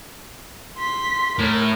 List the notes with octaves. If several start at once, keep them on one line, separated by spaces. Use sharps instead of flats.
C6 B6
A2 A#4